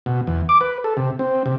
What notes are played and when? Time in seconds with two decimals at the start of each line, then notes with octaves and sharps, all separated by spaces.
0.06 B2
0.27 E2
0.49 D6
0.61 B4
0.84 A4
0.97 C3
1.19 C4
1.46 C3